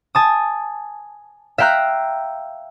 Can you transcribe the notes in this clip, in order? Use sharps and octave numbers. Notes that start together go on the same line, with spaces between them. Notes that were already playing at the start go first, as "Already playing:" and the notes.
G#5 A5 D#6
E5 F5 G5 A#5 F#6 B6